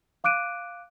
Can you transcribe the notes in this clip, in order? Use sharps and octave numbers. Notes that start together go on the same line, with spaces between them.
F5 D6 F#6 D7 D#7